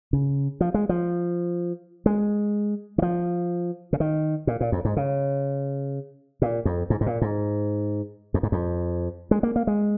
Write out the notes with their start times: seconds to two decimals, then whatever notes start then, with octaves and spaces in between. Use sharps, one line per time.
0.13 C#3
0.61 F3
0.74 G#3
0.89 F3
2.06 G#3
2.98 D#3
3.02 F3
3.93 C#3
4.00 D#3
4.47 A#2
4.61 A#2
4.72 F2
4.85 G#2
4.97 C#3
6.42 A#2
6.65 F2
6.90 G#2
7.01 G#2
7.06 A#2
7.22 G#2
8.34 F2
8.43 G#2
8.52 F2
9.31 G#3
9.43 A#3
9.56 A#3
9.67 G#3